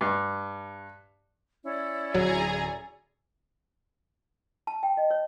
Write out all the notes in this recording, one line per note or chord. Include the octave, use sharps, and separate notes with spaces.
G2
C#4 E4 D5
D1 F#3 G#4 G#5 A#5
A5
G5
D#5
C#5